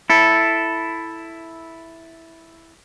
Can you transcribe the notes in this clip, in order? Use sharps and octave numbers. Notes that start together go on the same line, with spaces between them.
E4 A4